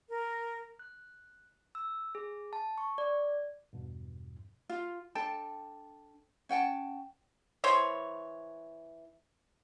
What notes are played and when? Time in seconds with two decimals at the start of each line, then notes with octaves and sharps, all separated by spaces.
0.09 A#4
0.79 F#6
1.75 E6
2.15 G#4
2.53 A5
2.78 C#6
2.98 D5
3.73 E2 G2 B2
4.69 F4
5.15 D4 A4 G5 A5
6.49 C#4 F#5 G5 A5
7.64 E3 C5 C#5